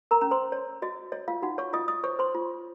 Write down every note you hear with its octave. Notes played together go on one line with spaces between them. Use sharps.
A#4 A#5
C#4 A#5
C5 C6
C#5
F#4 D#5
C#5 D#5
F4 F5
D#4 F#4 F#5
C#5 C#6
F4 D#5 D#6
D#5 D#6
C5 C#5 C#6
C5 C6
F4